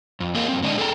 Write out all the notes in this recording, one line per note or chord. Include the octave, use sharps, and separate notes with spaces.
F2
F#3 A#3 G#4 A#4 D#5 F5
F#2 C4
D3 G#3 D4 D#4 D#5
G#4 A4 D5 F5 G5 A#5